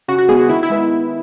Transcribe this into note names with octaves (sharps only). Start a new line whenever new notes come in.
C#3 F#4
F#4
G#3 B3 G#4
F#4
D#3 E4
E4
G#3 B3